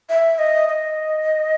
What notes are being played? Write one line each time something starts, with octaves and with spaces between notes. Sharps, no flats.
E5
D#5
D#5